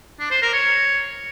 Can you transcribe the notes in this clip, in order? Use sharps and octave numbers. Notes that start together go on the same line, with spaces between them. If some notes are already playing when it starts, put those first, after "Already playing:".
D4
C5
A#4
C#5